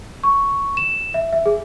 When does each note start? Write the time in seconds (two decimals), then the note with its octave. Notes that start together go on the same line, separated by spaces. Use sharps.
0.23 C#6
0.77 E7
1.14 E5
1.33 E5
1.46 G#4